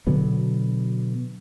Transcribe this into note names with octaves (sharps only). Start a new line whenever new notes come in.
B2 D3 F#3 B3